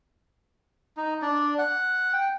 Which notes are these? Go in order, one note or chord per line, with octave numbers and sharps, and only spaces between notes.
D#4
D4 D5
F#5
G5